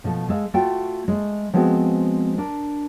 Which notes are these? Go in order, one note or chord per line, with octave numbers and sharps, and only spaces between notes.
B2 F3 A3
G#3 A4 E5 F5
A3 F4 F#4 G5
G#3 A3
F3 G#3 B3 C4 F#4
D4 A#4